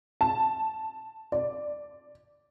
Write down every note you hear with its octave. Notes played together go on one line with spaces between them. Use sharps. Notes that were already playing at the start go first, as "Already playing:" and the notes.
A5
D5